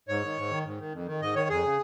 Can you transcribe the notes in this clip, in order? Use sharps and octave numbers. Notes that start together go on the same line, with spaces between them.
G#2 C#5
D#3
G#2
D#3
G#2
D#3
F2
D#3
G#2 D#5
D#3 C#5
F2 G#4
C#3